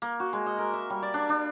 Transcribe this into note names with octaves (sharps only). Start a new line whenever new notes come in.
A#3
F#4
G#3
D#5
A#4
E5
G3
D5
D4
D4